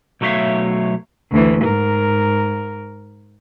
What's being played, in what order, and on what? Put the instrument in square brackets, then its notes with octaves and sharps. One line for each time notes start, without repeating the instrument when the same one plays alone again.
[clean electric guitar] B1 F#3 A3 C#5 E5 F5
[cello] D2 E3
G#2 A#4